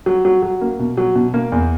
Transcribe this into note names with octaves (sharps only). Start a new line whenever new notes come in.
F#3
F#3
F#3
A#3
B2
F#3
B2
A#3
E2